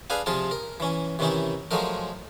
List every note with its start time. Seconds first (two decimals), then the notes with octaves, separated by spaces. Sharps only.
0.10 D4 G#4 B4 F5 G#5
0.26 C3 F3 F4 G#4 A5
0.51 A#4
0.80 E3 C#4
1.19 C3 D#3 E3 C#4 D#4 E4
1.71 F3 F#3 G#3 A3 D#4 A#4